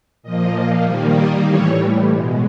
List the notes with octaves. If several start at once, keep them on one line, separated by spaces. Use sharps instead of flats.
A#2 F3 A#3 D#5
D#3 G3 A#3
D#5
A2 E3 G3 C#5
B2 G#3